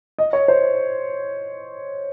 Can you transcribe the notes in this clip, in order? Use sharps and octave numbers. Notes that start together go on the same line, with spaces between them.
D#5
C#5
C5